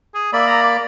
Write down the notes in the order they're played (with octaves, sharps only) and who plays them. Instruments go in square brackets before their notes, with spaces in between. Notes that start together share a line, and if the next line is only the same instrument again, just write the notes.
[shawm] G#4
[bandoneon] A#3 D5 B5 [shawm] E5
[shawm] A#5
D6